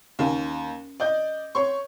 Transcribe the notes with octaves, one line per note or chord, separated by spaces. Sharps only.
D#2 C#4 G#5
D5 D#5 G6
C#5 C6 C#6